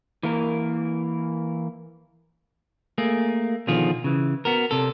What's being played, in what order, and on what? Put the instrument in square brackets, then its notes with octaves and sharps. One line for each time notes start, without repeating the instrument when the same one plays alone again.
[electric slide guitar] E3 A#3 A#4
[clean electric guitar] A3 A#3 G#4
B2 D3 D#3 F3 F4 G#4
C#3 E3
B3 F#4 A#4
C3 A4